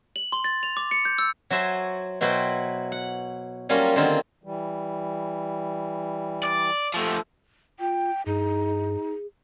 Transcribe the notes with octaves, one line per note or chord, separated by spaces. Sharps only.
F#7
C6
A6
F7
D6
C#7
G6
E6
F#3 F#4 C5 E5 G#5 C6
B2 F#3 E4 B4 C5 G5
F#5
F#3 G3 A#3 C#4 F4
D3 D#3 A#3 C4 F4
E3 G3
D5
F3 A3
F4 G5
G2 D#4 G#4